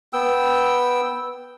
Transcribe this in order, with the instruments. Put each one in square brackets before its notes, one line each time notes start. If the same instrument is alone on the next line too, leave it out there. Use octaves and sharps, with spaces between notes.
[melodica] B3 G5 E6